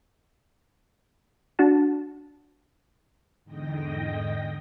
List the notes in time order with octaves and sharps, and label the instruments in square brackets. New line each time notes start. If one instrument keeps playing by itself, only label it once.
[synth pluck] D4 F#4 A5
[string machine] E2 G#2 D3 D#5 G5 A#6